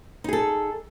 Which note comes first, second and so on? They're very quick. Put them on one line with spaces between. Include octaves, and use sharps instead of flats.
D#4 G#4 A4